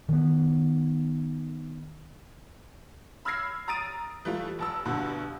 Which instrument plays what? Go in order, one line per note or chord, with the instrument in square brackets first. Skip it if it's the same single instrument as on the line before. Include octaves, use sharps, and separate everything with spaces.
[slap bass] D#3 B3
[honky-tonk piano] B5 E6 F6 G#6 A#6 C7
A#5 D#6 A6 D7 D#7
E3 G3 A3 F4
F1 A5 E6
F1 G2 B2 D3